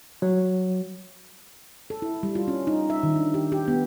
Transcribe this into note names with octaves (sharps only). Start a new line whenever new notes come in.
F#3
A4
E4
G3
F4
C#4
D#4
E5
D#3
D4
G4
G4
B3